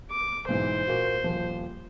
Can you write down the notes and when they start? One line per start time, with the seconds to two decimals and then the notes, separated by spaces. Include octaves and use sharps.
0.11 D6
0.48 B1 G#2 E3 C5
0.87 A#2 A#3 F#4
1.24 D#1 F3